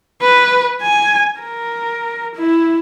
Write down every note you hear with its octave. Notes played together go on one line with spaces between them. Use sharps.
B4
G#5
A#4
E4